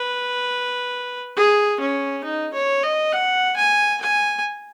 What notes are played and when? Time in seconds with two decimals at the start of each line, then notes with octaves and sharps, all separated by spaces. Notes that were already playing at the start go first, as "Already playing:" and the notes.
Already playing: B4
1.37 G#4
1.80 C#4
2.24 D#4
2.54 C#5
2.83 D#5
3.12 F#5
3.57 G#5
4.01 G#5